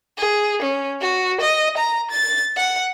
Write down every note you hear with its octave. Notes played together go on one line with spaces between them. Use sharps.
G#4
C#4
F#4
D#5
A#5
A6
F#5